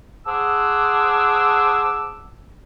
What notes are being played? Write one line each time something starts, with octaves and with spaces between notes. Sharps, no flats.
G#4 C5 F#5 A5 D6 E6